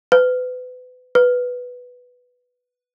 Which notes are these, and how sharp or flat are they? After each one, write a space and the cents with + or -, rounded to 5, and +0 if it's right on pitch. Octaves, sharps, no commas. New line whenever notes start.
B4 +30
B4 +0